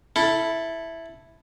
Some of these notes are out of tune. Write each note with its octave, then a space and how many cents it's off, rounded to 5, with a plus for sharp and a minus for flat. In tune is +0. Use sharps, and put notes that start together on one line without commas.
E4 +0 A4 +0